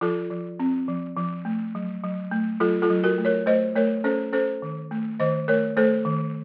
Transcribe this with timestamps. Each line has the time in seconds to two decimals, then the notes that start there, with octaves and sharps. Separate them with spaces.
0.01 F3 F4 A4
0.30 F3
0.60 C4
0.88 F3
1.16 F3
1.45 A3
1.75 F#3
2.03 F#3
2.31 A3
2.60 F#3 F4 A4
2.82 F4 A4
2.90 F#3
3.04 F#4 A#4
3.18 A3
3.25 A#4 C#5
3.46 A3 C5 D#5
3.76 A3 A#4 C#5
4.04 C#4 A4 C5
4.33 C#4 A4 C5
4.62 D#3
4.91 A3
5.19 D#3 C5 D#5
5.48 A3 A#4 C#5
5.77 A3 A4 C5
6.05 D#3